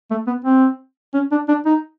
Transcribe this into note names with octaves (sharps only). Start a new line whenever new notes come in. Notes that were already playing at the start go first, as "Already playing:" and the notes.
A3
B3
C4
C#4
D4
D4
D#4